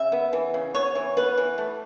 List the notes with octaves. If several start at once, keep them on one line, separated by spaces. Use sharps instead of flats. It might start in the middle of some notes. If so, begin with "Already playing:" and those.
Already playing: C#3 E5
B3
E3
C#3
B3 C#5
E3
B3 B4
E3
A3